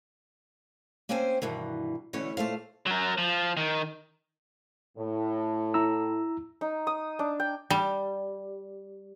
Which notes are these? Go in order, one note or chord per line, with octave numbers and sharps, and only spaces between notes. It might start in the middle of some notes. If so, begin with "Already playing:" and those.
A#3 C4 C#4 C5 G5 G#5
G2 B2 D#3 E3
B2 D3 E3 A3 C#4 C#5
A#2 A3 C5 F5
F#3 A#4
F3
D#3
A2
E4 A#5 E6
D#4
D#6
D4
G5
G3